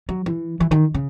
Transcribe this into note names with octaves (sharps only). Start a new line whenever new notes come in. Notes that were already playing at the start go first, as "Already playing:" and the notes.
F#3
E3
E3
D#3
C#3